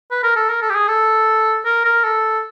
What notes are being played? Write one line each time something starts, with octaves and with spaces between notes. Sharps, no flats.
B4
A#4
A4
A#4
A4
G4
G#4
A4
A#4
A#4
A4